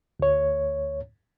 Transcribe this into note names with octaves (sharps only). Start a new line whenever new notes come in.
D2 C#5